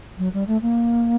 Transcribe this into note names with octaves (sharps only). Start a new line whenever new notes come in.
F#3
G3
A3
A#3